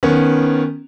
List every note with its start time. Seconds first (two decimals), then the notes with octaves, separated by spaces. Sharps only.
0.03 D#3 B3 C#4